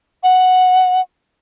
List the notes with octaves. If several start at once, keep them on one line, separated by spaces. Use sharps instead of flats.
F#5